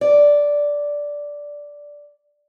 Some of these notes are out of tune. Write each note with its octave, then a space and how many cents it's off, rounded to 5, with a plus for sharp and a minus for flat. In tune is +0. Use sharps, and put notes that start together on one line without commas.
D5 -10